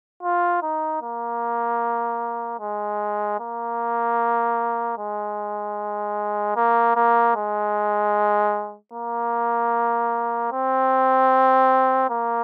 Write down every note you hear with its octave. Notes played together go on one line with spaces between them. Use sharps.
F4
D#4
A#3
G#3
A#3
G#3
A#3
A#3
G#3
A#3
C4
A#3